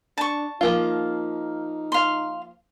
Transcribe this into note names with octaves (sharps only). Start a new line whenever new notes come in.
D4 A5 C#6
F3 A#3 D#4 F4
F5 C6